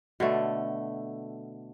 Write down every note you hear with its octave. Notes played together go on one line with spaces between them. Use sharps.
B2 D3 A3